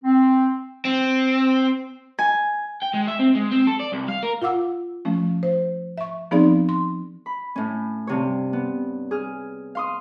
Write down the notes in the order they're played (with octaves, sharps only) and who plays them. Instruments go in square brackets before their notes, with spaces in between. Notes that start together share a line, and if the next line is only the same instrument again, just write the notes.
[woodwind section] C4
[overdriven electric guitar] C4
[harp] G#5
[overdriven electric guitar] G5
G#3
E5
C4
G#3
C4
A4
D5
C2
F5
A#4
[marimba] F4 F5 F#5 D6 E6
F3 A3 C#4
C5
E5 C#6
F3 B3 C4 D#4 G#4 D5
C6
[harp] B5
A2 C#4
G2 C3 C#5
B3
G#4 F6
F5 C6 D#6